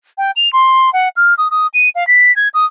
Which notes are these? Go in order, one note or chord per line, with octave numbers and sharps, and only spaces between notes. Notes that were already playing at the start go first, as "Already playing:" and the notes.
G5
F7
C6
F#5
F6
D#6
D#6
D#7
F5
B6
G#6
D#6